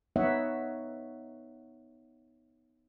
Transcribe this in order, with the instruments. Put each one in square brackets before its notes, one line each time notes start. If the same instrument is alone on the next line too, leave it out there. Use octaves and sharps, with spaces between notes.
[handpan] B3 D#4 C#5 D#5 E5 F#5